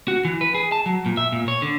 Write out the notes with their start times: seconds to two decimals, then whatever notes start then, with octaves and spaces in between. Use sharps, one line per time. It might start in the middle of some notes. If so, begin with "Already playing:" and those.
0.08 F#4
0.25 E3
0.41 B4
0.54 G#4
0.72 A5
0.86 F#3
1.06 A#2
1.17 E5
1.32 A#2
1.48 C#5
1.62 D3